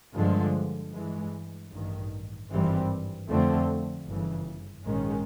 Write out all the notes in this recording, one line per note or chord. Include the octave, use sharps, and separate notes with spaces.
G2 D3 F3 G#3
G2 E3 G#3
A1 G2 D#3
G#1 G2 E3 G3 C4
F2 D3 F3 A3 C4
G1 F#2 C#3 E3
A#1 G#2 D#3 G#3 C#4